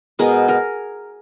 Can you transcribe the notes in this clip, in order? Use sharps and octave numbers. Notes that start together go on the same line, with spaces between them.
B2 G#3 B3 G#4 A#4
G#4 A#4